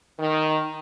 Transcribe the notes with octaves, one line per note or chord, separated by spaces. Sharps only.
D#3